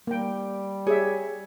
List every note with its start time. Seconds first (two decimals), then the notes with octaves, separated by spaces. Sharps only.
0.07 G3 A#3 G5
0.87 G4 G#4 C#5 E5